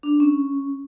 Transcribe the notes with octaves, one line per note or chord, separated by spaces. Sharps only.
D4
C#4